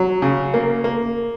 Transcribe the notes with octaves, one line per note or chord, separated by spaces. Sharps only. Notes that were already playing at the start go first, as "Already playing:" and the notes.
Already playing: F#3
C#3
A#3
A#3